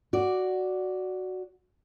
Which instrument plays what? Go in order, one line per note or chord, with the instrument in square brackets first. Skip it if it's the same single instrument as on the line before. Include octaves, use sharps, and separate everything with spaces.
[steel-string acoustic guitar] F#4 D5